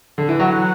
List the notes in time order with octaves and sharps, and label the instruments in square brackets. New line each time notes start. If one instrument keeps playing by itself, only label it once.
[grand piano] D3
E3
[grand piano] F#3 [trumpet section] F#4 B4 F#5